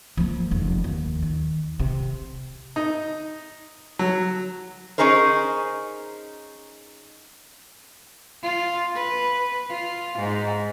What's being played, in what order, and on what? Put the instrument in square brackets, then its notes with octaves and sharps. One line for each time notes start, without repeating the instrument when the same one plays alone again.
[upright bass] F3 A#3
F1 E2
D#2
D#3
C3
[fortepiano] D#4
F#3
[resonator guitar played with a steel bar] C#4 D#4 G#4 A#4 C5
[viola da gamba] F4
B4
F4
G#2